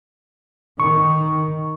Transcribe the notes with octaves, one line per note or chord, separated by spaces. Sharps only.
D#3 C#6